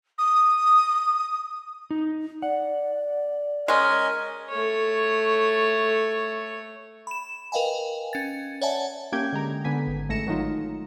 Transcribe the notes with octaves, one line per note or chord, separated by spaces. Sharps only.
D#6
D#4
D5 F#5
G#3 C#4 A#4 D#5 G#5
A3 C#5
B5 E7
A#4 B4 D#5 F5 G5 G#5
C#4 A6
C#5 D5 E5 F#5 G#5 A5
A#3 C#4 G4 G5 G6 G#6
D3 G#3 A#5
D3 B3 G#5 B6
G#1
A1 G#3 A3 A#6 C#7 E7
D#3 F#3 A3 D#4 F4